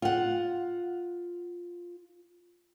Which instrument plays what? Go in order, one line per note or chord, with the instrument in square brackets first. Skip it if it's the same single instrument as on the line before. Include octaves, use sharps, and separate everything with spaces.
[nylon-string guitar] F4 F#5